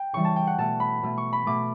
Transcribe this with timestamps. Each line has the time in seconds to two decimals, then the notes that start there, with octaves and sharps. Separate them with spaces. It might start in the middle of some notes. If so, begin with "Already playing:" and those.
Already playing: G5
0.13 C#3 E3 G3 C#6
0.25 A5
0.36 G5
0.47 F#5
0.58 B2 A3 A5
0.80 B5
1.03 B2 A3
1.18 C#6
1.33 B5
1.46 B2 A3 D6